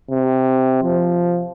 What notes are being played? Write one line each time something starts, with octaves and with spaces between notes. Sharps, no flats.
C3
F3